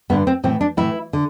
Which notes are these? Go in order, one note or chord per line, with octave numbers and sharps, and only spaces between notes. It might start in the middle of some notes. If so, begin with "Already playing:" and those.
G2 D3 B3
C4
A2 E3 C4
D4
A2 E3 E4
D3